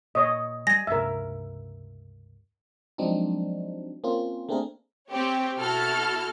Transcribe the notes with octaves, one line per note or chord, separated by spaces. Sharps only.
A#2 C#5 D#5
G3 G#5 A#6
C#2 G2 C3 A#4 E5
F3 F#3 G#3 C4 D4 D#4
A#3 C4 C#4 F4
A3 A#3 C4 D4 G#4 A#4
C4 G4 C#5
B2 E4 F#4 A4 F6